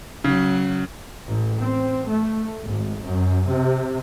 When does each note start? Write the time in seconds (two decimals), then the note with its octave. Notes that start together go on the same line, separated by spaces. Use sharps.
0.24 C#3 F#3
1.27 A1
1.60 C4
2.09 A3
2.63 G#1
3.03 F#2
3.49 C3